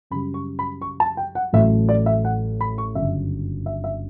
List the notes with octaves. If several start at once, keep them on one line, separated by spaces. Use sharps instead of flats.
F#2 C#3 G3 B5
C#6
B5
C#6
A5
G5
F#5
A1 A2 F#3 A3 E5
D5
E5
F#5
B5
C#6
G1 F#2 C#3 F#3 E5
E5
E5